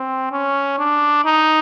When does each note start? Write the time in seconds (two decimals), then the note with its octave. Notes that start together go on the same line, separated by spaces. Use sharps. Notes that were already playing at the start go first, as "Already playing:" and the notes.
Already playing: C4
0.32 C#4
0.78 D4
1.25 D#4